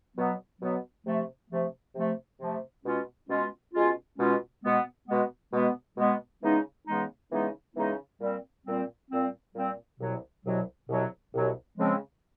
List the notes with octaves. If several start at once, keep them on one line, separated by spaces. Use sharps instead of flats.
B2 F#3 B3
B2 F#3 B3
C3 F3 A3
C3 F3 A3
C3 F3 A3
C3 F3 A3
B2 G#3 C#4 F4
B2 G#3 C#4 F4
B2 G#3 C#4 F4
B2 G#3 C#4 F4
B2 G#3 B3
B2 G#3 B3
B2 G#3 B3
B2 G#3 B3
C#3 E3 G#3 B3 D#4
C#3 E3 G#3 B3 D#4
C#3 E3 G#3 B3 D#4
C#3 E3 G#3 B3 D#4
A#2 G3 C4
A#2 G3 C4
A#2 G3 C4
A#2 G3 C4
C2 B2 F#3
C2 B2 F#3
C2 B2 F#3
C2 B2 F#3
C#3 F3 G#3 C4